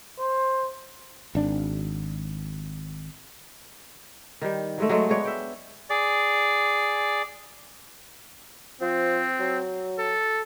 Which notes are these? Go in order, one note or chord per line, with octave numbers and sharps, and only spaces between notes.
C5
G#1 D4
D#3 G3
F#3 G#3 A3
F#3 G#3 A3 D5
G#3 B3 D4 C#5
E5 G5
G#4 D5
F3 C4
F#3
A4